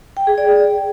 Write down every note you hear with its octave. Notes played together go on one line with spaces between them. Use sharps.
G5
G#4
D5